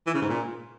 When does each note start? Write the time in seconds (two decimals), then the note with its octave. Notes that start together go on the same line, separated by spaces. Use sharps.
0.07 E3
0.14 C#3
0.22 G#2
0.29 A#2